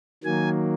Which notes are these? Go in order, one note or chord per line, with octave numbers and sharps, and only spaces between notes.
D#3 F#3 A#3 G#5